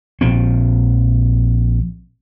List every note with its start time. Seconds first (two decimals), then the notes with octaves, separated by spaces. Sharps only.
0.21 A#1 F3 C4